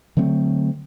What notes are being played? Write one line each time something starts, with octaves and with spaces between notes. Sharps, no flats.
D3 F#3 A3 C4